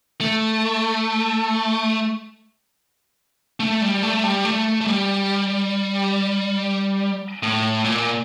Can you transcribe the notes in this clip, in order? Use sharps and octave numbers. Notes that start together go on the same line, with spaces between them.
A3
A3
G3
A3
G3
A3
A3
G3
A2
A#2